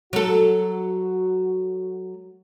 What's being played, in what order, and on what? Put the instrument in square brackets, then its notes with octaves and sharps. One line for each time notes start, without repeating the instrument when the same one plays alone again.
[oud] F#3 A4 [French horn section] F#4